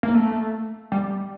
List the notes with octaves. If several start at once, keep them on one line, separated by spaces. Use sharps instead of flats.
A#3
A3
G3